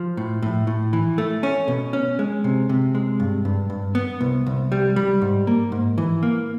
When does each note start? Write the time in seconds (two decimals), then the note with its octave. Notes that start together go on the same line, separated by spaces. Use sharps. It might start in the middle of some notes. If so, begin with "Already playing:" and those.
Already playing: F3
0.17 A2
0.42 A2
0.67 A2
0.93 E3
1.18 A3
1.43 C#4
1.68 B2
1.93 C#4
2.19 G#3
2.44 C3
2.69 C3
2.95 G#3
3.20 G2
3.45 G2
3.70 G2
3.95 B3
4.21 C2
4.47 C2
4.72 G3
4.96 G3
5.21 G#2
5.47 A#3
5.72 G#2
5.98 E3
6.23 A#3